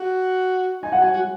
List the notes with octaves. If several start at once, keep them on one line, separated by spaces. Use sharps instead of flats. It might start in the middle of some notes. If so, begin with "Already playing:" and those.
Already playing: F#4
D#4 G#5
F#5
F#4 G#5
F#4